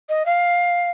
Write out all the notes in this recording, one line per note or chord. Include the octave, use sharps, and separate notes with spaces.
D#5
F5